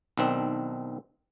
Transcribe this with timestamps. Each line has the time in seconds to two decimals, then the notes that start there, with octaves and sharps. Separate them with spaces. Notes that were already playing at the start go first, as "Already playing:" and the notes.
0.18 B1 D#3 C4 D4